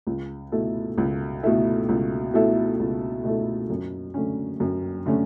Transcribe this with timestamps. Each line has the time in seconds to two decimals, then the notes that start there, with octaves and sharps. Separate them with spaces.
0.07 C#2
0.52 B2 A3 E4 A4
0.98 C#2
1.43 B2 A3 E4 A4
1.89 C#2
2.34 B2 A3 E4 A4
2.79 C#2
3.24 B2 A3 E4 A4
3.70 F#2
4.14 D3 A3 C#4
4.60 F#2
5.06 D3 A3 C#4